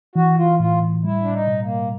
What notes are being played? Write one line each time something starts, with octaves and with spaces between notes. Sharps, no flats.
E3 F#4
F4
A2 F4
G3 E4
D4
D#4
B2
A#3